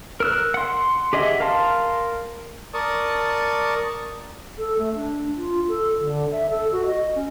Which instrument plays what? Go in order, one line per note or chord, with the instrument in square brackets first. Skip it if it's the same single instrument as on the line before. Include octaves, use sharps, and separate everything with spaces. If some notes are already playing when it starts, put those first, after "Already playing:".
[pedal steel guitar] A#4 E6 F#6
F#5 C6
G4 G#4 D#5 E5 F#5
A#4 F5 A5 C6
[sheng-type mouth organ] A#4 D5 A5 C#6 D#6
[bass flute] A4
A3
D4
F4
A4
D3
E5
A4
F#4
D#5
C#4